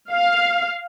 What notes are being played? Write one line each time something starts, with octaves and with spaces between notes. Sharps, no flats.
F5